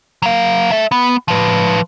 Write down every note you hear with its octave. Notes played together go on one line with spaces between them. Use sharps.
F#3 F5
A4 E5
B3
F3 B4